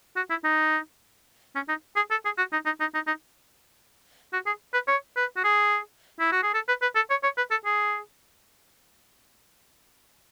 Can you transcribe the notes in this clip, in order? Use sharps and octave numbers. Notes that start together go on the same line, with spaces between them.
F#4
E4
D#4
C#4
D#4
G#4
A4
G#4
F#4
D#4
D#4
D#4
D#4
D#4
F#4
G#4
B4
C#5
B4
F#4
G#4
E4
F#4
G#4
A4
B4
B4
A4
C#5
C#5
B4
A4
G#4